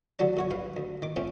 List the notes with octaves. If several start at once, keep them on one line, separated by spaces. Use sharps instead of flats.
D2 D3 F#3 G3 D4
F#2 F#4 C#5
G2 B4 F5
D2
D#3 D6
F3 A3 C4 C#4